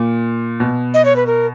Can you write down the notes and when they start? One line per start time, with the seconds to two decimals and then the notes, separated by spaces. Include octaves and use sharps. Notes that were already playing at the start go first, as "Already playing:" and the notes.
Already playing: A#2
0.60 B2
0.94 D#5
1.05 C#5
1.16 B4
1.26 A#4